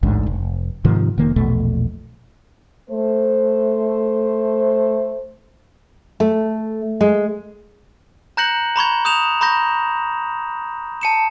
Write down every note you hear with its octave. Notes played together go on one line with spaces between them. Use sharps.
A1 D2 G#2 D3
F1
G#2 C3 D#3 F3
F1 D#3 A#3
A#1 E2 B2 A3
A3 C5
A3
G#3
A#5 F#6 G6 A#6 C#7 F#7
A#5 B5 C#6 G#6
D#6 G6 E7 F7
A#5 B5 C#6 G6 A#6
A5 C#7 E7